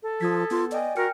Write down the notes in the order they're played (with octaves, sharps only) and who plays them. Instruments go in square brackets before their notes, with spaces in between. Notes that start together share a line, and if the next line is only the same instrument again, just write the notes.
[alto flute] A4
[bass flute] F3 [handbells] D#6 G#6 B6
[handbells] B3 [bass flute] F4
[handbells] D5 G5 G#5 [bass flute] D#5
[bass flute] F#4 [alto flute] A#4 [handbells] G5 F6 C#7